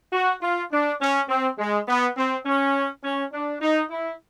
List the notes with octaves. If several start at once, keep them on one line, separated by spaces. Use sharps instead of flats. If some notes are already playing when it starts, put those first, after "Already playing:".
F#4
F4
D4
C#4
C4
G#3
B3
C4
C#4
C#4
D4
D#4
E4